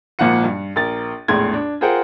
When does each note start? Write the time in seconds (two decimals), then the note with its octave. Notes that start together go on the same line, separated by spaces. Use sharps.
0.19 G#1 A#2 F3 F5 F#5 C#7
0.44 G2
0.76 A#1 A#4 A6
1.28 A#1 E2 A2 G#3 C6 G#6
1.53 D4
1.81 F4 G#4 A#4 C5 F#5 G5